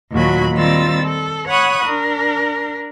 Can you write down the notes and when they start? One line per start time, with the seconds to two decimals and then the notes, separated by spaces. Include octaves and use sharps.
0.12 D#2 A#2 F#3 F#4 B5
0.54 D#3 G3 C4 F4 E6 A6
1.04 A4
1.48 C#5 F#5 B5 C#6 D#6 F#6
1.84 D4 A#4